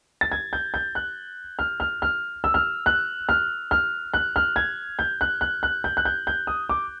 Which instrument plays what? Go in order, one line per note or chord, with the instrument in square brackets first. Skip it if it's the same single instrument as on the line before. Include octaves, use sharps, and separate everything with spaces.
[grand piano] A6
G#6
G6
G6
F#6
F6
F6
F6
E6
F6
F#6
F6
F6
F#6
F6
G#6
G6
F#6
F#6
F#6
G6
F#6
G6
G6
D#6
D6